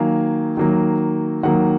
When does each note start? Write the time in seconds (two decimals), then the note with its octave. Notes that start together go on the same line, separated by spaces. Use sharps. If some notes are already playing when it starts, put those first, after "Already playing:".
Already playing: D#3 F#3 A#3 F5 G#5
0.57 D#3 F#3 A#3
1.43 D#3 F#3 A#3 F#5